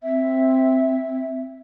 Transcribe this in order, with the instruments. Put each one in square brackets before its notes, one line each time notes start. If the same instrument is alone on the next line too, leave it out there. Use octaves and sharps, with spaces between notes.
[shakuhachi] C4 [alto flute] E5